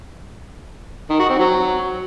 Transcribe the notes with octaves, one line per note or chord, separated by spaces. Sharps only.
D#3
F#4
C4
F#3